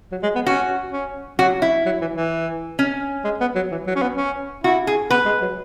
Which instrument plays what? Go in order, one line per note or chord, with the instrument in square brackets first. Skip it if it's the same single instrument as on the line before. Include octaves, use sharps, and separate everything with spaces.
[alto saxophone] F#3
G#3
B3
[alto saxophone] C#4 [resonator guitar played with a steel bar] F#4
[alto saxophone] C#4
[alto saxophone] F#3 [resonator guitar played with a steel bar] F#4
[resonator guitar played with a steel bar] E4
[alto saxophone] F#3
E3
E3
[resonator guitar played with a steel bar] C#4
[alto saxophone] G#3
B3
F#3
E3
F#3
C#4
B3
C#4
[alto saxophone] E4 [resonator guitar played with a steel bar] F#4
[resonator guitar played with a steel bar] G#4
[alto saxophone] B3 [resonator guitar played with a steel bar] B4
[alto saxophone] G#3
F#3